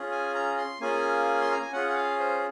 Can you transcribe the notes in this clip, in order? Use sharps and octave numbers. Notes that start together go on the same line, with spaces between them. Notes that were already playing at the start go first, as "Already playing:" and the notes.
Already playing: C#4 F4 G#4
G#5
A#5
C6
A#3 C#4 F4 G#4 G#5
C6
A#5
G#5
C#4 F4 G#4 F#5
F#5
F5
C5